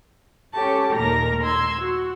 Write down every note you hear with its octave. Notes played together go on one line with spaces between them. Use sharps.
C#4 G4 A4 C#5 A5
D#2 A#2 A#4 A#5 A#6
C6 E6 G#6
F#4